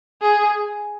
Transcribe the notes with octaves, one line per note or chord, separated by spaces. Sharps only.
G#4